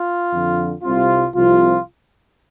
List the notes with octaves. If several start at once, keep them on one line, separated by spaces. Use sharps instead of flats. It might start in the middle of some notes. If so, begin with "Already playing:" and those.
Already playing: F4
F2 D3 F3
C2 C3 G3 C4 F4
C2 C3 F3 F4